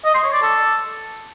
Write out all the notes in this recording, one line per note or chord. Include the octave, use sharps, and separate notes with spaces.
D#5
C6
C#5
D5
A4